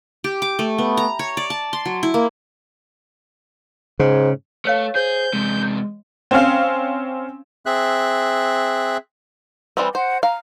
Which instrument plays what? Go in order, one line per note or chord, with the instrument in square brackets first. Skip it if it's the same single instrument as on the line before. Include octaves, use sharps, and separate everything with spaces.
[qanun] G4
D6
A3
B3
A#5
C#5
D5
A5
C6
F#3
E4
A#3
[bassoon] G#2 [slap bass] C#3
[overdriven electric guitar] A3 [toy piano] B4 C#5 F5
[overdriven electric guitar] G#4 [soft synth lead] C5 [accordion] G6
[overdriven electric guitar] E2 C3 [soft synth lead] G#3
[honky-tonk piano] C4 C#4 F5
[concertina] C4 G#4 E5 F#6
[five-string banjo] E3 G3 C4
[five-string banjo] C5 [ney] F#5
[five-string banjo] F5 [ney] A#5